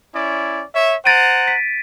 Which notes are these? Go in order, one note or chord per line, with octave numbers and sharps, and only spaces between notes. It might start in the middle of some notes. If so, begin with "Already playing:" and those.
C#4 E4 D5
C#5 E5
C5 F#5 A#5 A6 D7 D#7
B6